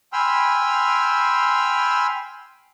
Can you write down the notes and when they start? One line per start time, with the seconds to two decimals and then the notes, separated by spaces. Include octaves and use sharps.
0.13 G5 G#5 B5 C6 E6 F6